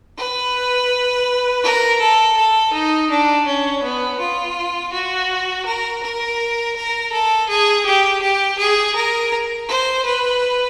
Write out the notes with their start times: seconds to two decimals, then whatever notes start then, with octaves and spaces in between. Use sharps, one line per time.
0.17 B4
1.63 A#4
2.01 A4
2.36 A4
2.73 D#4
3.10 D4
3.47 C#4
3.83 B3
4.20 F4
4.93 F#4
5.66 A#4
6.03 A#4
6.76 A#4
7.12 A4
7.49 G#4
7.86 G4
8.22 G4
8.59 G#4
8.95 A#4
9.68 C5
10.05 B4